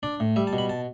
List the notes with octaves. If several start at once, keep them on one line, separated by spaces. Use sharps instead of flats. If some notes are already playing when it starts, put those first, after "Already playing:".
D4 D5
A2
G3 E5
A5
B2
B5
A5